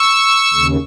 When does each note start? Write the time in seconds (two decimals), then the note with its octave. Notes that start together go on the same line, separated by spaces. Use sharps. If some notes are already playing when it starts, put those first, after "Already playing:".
Already playing: C#6 E6
0.53 D#2 C#3